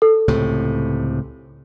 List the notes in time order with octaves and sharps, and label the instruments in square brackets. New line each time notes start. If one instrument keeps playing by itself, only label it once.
[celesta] A4
[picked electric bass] C#2 A2 C3